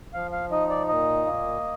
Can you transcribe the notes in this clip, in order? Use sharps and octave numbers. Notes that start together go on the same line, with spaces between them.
F3 F5
F5
D#4 D#5
D5
A#2 D#5
A#3